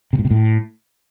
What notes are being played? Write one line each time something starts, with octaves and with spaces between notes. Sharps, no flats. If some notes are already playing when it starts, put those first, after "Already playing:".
C3
A2
C3
A2